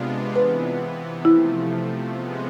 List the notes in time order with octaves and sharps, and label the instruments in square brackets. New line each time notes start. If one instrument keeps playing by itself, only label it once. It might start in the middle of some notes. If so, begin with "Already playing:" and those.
Already playing: [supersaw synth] C3 G#3 B3 D4 F4
[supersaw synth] C3 E3 B3 [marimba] B4
[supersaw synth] C3 F3 A3 [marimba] E4
[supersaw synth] C3 F3 G#3 B3